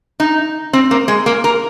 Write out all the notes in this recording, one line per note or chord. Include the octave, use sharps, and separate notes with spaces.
D#4
C4
A#3
G#3
A#3
A#4